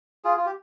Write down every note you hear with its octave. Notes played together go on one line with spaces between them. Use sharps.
F4 G#4
F4
G4